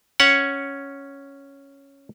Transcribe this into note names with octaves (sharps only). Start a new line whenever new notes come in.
C#4 C#5 F#5